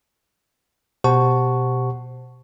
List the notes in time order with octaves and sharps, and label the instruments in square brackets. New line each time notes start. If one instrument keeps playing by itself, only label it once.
[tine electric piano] B2 G4 C5 F#5 A5 C#6